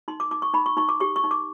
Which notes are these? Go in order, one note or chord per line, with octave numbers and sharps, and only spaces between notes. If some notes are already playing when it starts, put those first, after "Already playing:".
D#4 C6
D6
D#4 D6
C#6
D#4 B5
C#6
D#4 C#6
D6
G4 C#6
C#6
D#4
D6